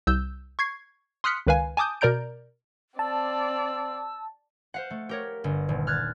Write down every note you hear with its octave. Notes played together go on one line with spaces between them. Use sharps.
C2 E6 G6
C#6 G#6 C7
C6 D#6 F6 F#6 B6 C#7
C#2 D#3 B4 F5 G#5
G#5 A5 D6 D#6 G6
B2 A#4 D5 A#5 G6 D7
C4 D5 A5 E6
C5 F5 F#5
A3
G4 A#4 C#5
G1
D#1
F6 F#6 G#6 A6